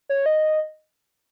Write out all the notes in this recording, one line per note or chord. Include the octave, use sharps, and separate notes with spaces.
C#5
D#5